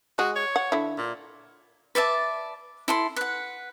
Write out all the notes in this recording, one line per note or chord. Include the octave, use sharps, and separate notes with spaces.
G#3 F#4
C#5
F#5
D3 E4
A#2
B4 D5 E5 A5
E4 A4 C6
B4 F#5